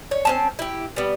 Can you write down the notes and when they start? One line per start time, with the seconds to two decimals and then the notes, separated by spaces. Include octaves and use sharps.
0.11 C#5
0.25 C4 C#4 A5
0.59 E4 G4
0.96 G3 B3